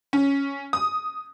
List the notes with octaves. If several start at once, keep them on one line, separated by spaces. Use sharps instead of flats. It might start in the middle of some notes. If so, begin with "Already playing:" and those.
C#4
D#6